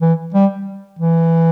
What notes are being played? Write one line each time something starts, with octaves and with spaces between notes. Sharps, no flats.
E3
G3
E3